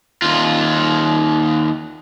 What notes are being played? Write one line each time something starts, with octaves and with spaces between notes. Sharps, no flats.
D#2 F4